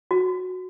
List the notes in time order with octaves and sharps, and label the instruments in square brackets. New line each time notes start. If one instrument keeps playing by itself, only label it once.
[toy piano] F#4